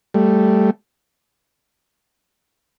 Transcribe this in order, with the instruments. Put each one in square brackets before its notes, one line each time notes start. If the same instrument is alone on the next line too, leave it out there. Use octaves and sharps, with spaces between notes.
[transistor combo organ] G3 A3